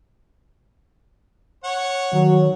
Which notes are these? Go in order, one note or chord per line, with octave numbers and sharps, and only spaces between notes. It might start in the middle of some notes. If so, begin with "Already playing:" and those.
C#5 F#5
D#3 F#3